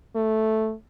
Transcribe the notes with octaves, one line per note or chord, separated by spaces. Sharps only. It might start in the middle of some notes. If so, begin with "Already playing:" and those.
A3